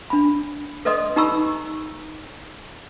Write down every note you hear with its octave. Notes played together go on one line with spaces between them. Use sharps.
D4 B5
A4 B4 D5 D#5 C6 D#6
D#4 G4 A#5 B5 C#6 E6